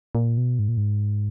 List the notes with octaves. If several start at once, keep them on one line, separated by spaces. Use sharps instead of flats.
A#2
B2
G#2
A#2
G#2